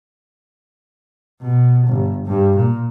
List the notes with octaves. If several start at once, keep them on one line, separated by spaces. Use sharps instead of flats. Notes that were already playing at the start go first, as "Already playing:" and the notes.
B2
G1
G2
A#2